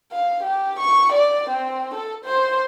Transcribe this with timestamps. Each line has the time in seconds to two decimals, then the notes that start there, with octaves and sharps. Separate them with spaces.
0.12 F5
0.43 G4
0.79 C#6
1.12 D5
1.49 C4
1.94 A4
2.25 C5